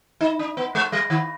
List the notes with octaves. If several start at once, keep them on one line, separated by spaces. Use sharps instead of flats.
D#4
D4
B3
G#3
G3
D#3